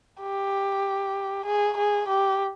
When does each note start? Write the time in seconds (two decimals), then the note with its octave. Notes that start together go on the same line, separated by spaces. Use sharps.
0.21 G4
1.46 G#4
1.78 G#4
2.09 G4